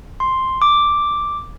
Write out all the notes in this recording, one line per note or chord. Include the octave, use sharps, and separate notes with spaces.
C6
D6